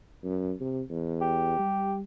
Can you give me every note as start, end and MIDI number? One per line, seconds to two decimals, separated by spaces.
0.23 0.53 42
0.60 0.82 48
0.89 1.54 40
1.21 1.95 67
1.59 2.02 55